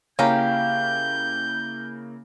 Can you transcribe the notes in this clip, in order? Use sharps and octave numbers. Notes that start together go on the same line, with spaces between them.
C#3 A#3 C#4 E4 G4 F5 A#5 G6